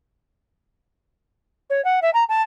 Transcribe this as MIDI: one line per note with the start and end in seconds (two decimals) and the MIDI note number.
1.70 1.83 73
1.84 2.00 78
2.02 2.10 76
2.14 2.24 82
2.29 2.42 81